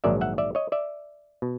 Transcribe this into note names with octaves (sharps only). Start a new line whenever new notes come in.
A#1 G#2 D#3 F#3 D5 E5
E5 F#5
D5 E5
C#5 D#5
D5 E5
B2